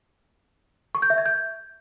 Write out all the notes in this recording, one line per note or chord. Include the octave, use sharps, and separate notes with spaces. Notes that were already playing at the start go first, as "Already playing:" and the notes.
C#6
G6
E5
G#6
G6